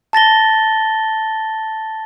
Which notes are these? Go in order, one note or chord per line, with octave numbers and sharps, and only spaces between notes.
A5 A6 A#6 G7